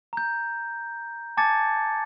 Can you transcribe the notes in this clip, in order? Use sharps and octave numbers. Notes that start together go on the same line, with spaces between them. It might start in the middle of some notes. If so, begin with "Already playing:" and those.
A#5 G6
G#5 A5 D6 G#6 A6 C#7